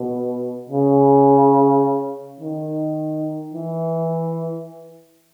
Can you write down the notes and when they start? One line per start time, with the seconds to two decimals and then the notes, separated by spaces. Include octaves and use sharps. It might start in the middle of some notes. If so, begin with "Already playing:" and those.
Already playing: B2
0.69 C#3
2.40 D#3
3.54 E3